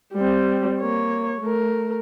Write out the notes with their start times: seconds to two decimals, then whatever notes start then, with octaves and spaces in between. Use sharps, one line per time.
0.14 G3 C4
0.80 A#3 C#5
1.41 A3 A#4